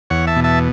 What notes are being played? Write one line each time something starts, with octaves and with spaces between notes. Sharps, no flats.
E2 C#5 F#5
E5 A5
B2
E5 A5